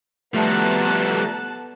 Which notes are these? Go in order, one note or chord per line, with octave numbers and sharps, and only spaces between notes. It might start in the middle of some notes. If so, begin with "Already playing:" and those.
F3 G3 A3 B3 A5 A#5 F#6